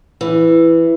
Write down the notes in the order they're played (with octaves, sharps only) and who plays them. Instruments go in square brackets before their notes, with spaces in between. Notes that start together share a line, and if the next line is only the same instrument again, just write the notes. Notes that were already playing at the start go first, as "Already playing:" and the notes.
[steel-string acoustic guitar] E3